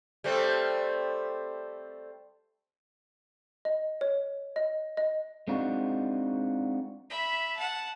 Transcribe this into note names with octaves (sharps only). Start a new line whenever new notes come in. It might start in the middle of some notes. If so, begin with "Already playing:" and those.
G3 A3 C4
D#5
C#5
D#5
D#5
G#3 C4 D4 D#4 F4 F#4
E5 B5
F#5 A5